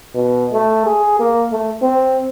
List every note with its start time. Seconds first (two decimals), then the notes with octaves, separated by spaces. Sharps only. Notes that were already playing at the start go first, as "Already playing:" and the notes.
0.14 B2
0.52 A3
0.86 G#4
1.19 A#3
1.52 A3
1.82 C4